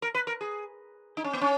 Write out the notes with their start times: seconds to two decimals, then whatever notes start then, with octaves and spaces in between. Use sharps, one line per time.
0.02 A#4
0.15 B4
0.27 A#4
0.41 G#4
1.17 D#4
1.24 C#4
1.33 B3
1.41 C#4